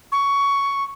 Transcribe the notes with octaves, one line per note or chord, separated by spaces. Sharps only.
C#6